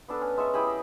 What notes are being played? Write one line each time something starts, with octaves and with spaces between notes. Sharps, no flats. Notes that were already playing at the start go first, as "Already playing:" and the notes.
B3 D4 A4 B4
C#4
G#3 E5 A5 C#6
E4 G4 G#4 B5
D#5